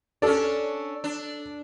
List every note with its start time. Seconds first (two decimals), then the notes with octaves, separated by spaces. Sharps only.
0.22 C#4 D4 A4 D5
1.04 D4